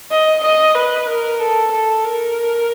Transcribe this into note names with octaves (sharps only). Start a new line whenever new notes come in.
D#5
D#5
B4
A#4
A4
A4
A#4